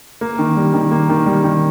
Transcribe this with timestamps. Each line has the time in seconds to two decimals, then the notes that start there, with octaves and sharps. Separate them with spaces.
0.21 A#3
0.39 D#3
0.57 G3
0.74 D#3
0.91 A#3
1.09 D#3
1.26 G3
1.44 D#3